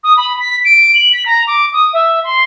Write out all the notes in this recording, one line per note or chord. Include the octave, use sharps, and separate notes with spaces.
D#6
B5
B6
D7
F#7
B6
A#5
D6
D#6
E5
C6